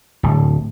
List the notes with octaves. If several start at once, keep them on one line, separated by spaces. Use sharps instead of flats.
D1